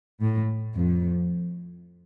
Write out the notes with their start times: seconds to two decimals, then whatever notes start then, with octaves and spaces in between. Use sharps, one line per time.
0.22 A2
0.74 F2